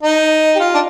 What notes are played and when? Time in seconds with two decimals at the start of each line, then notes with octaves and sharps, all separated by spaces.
0.03 D#4
0.55 G4
0.60 F4
0.74 D4